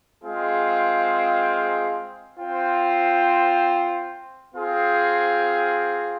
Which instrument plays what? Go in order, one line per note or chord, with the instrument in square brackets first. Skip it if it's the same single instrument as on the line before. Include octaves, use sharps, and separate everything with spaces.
[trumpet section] G#3 C4 F4 G#4
C4 F4 C5 G5
C4 F4 G#4